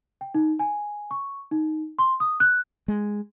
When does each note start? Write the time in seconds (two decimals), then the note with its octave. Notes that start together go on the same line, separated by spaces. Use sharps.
0.21 G5
0.35 D#4
0.59 G#5
1.11 C#6
1.51 D#4
1.99 C6
2.20 D#6
2.40 F#6
2.88 G#3